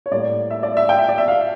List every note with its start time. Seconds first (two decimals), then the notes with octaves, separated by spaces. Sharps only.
0.06 C#5
0.11 A2 G3 A#3 D5
0.50 E5
0.63 D5
0.77 E5
0.89 G5
0.99 E5
1.09 D5
1.18 E5
1.28 F5